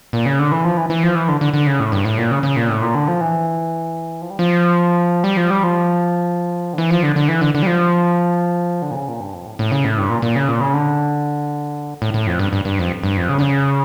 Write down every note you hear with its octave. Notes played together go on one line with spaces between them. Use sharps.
A#2
C#3
D3
E3
F3
E3
E3
F3
E3
D3
D3
D3
C#3
A2
G2
A2
A#2
C#3
C#3
A#2
A2
A#2
D3
F3
E3
F3
G3
F3
G3
F3
G3
F3
D3
E3
F3
D3
D3
E3
D3
D3
G3
F3
D3
A#2
C#3
A#2
G2
F2
A2
A2
C#3
A2
G2
A#2
A#2
C#3
A#2
C#3
D3
A2
A2
F2
G2
G2
G2
F2
G2
F2
C#3
D3
C#3